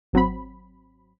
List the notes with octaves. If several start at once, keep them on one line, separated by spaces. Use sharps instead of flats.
G#1 F#3 C4 B5